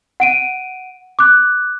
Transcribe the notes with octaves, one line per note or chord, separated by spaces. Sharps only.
F#5 D7 D#7
D6 F#6